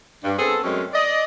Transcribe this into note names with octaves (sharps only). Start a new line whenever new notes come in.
G2
B3 C4 G#4 A4
F#2 F#3 G#3 A3 C4 C#4
D5 D#5